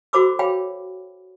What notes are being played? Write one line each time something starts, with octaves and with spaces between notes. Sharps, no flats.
F#4 A4 C5 B5 D6 E6
G#4 C#5 F5 G5 B5